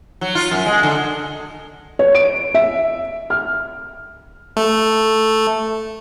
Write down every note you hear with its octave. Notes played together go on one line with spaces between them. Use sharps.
F#3
F4
F#2
G#3
D3
C#5
D7
E5
F6
A3